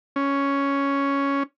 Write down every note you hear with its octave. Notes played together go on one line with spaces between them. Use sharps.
C#4